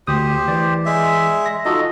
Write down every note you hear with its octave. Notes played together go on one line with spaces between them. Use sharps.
D2 G4 C5 D#6
E3 D5
G#3 E5
A#6
D#4 F4 F#4 A4 D#5